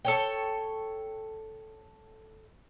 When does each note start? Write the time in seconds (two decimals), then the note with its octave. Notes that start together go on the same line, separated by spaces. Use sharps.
0.05 A4 C#5 G5